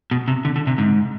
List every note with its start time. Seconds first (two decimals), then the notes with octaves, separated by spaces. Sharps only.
0.11 B2
0.28 C3
0.45 D3
0.56 D3
0.67 C3
0.78 G#2